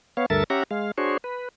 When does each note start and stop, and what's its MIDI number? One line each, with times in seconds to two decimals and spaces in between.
0.17 0.26 59
0.17 0.26 73
0.17 0.26 77
0.30 0.44 38
0.30 0.44 43
0.30 0.44 69
0.30 0.44 70
0.30 0.44 76
0.30 0.44 93
0.50 0.63 61
0.50 0.63 67
0.50 0.63 76
0.50 0.63 78
0.50 0.63 82
0.71 0.91 56
0.71 0.91 77
0.98 1.17 62
0.98 1.17 66
0.98 1.17 68
0.98 1.17 72
0.98 1.17 73
1.24 1.49 71